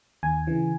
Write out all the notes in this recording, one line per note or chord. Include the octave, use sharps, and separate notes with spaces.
D#2 G#5
C#3 E3